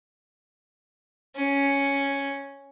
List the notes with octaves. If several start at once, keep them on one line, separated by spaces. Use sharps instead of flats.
C#4